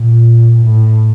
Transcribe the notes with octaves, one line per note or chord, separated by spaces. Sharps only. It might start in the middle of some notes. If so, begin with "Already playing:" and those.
Already playing: A#2
A2